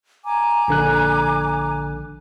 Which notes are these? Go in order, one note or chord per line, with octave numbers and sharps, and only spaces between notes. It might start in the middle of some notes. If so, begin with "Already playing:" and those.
G#5 A#5 D6
A#1 D3 F#6